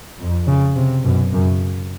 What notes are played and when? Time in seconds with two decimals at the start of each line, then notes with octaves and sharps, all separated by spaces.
0.19 F2
0.47 C#3
0.76 C3
1.04 F#2 B2
1.33 F#2 C#3